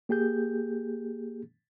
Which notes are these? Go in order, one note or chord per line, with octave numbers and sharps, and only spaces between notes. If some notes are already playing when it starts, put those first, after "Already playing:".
A#3 G4 G#4 G6